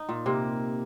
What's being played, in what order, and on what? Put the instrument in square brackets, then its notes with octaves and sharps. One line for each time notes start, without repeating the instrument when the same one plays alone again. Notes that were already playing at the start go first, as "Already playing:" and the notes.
Already playing: [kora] D#4
A#2
[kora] C3 [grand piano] A#3